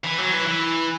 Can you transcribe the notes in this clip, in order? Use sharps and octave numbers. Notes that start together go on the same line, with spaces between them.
E3
F#3
E3
E3